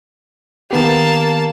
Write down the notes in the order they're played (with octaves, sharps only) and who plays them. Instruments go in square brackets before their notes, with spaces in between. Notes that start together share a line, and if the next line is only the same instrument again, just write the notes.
[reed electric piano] D#3 B3 G4 [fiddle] A#3 A5